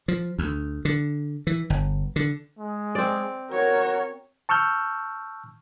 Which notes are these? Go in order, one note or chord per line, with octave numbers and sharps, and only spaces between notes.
F3
D2
D3
E3
G1
D3
G#3
C4 D5
F#4 A#4 C#5
A5 C#6 E6 F6 G6